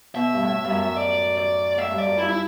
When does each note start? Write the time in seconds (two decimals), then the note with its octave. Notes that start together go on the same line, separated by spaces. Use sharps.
0.15 B2 E5
0.34 G2
0.42 A2
0.64 G2
0.70 F#2
0.96 D5
1.38 D5
1.77 A2 E5
1.91 G2
1.98 D5
2.05 F#2
2.18 G2 E4
2.29 E4